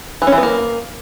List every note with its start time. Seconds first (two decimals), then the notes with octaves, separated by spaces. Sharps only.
0.22 E3
0.27 C#4
0.32 E3
0.38 B3
0.43 A#3